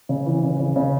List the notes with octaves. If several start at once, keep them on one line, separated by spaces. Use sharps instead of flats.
C#3
E3
C#3
C#3
C#3